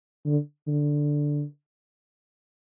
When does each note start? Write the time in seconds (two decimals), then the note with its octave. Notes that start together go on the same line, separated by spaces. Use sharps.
0.26 D3
0.67 D3